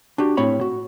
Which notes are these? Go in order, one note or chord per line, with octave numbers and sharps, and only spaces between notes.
D4 F#4 G4
A2 C4 C#5 B5
F#4